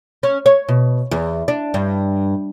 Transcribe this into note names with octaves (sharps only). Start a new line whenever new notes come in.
C#4
C#5
B2
E2
D4
G2